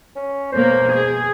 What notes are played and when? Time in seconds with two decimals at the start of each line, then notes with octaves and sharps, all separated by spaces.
0.16 C#4
0.52 B2 A#3 C5
0.93 G#4